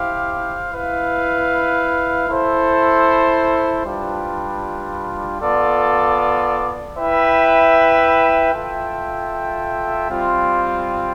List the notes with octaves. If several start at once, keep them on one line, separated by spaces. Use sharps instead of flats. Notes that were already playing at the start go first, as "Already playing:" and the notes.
Already playing: E4 G4 C5 F5
E4 B4 F5
E4 A4 C5
G3 D4 F4 B4
B3 F4 A4 D5
E4 B4 E5 G5
F4 A4 E5 G5
G3 C4 F4